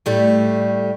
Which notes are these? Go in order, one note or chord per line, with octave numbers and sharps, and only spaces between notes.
A2 G3 A3